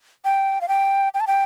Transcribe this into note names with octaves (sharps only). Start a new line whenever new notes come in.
G5
F5
G5
G5
A5
G5